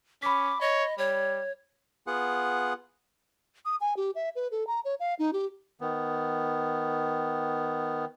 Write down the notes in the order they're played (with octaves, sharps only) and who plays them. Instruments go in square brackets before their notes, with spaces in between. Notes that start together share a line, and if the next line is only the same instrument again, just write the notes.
[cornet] C#4 [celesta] B5 B6 [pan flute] D6
[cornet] C#5 [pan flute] D#5
[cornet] G3 [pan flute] C#5
[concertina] B3 F4 G#4 F#5
[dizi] D#6
G#5
G4
E5
B4
A4
A#5
C#5
F5
D#4
G4
[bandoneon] D#3 B3